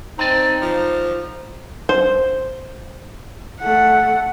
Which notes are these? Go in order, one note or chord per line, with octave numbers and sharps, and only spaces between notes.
C4 D#4 D5 D#5 A5
F3
C5
A3 F#5